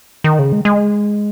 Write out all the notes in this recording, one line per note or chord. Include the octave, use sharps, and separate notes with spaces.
D#3
C#3
G#3
G#3